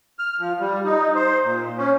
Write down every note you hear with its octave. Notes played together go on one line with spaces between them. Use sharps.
F6
F3
G3
D#4
C5
A#2
C#4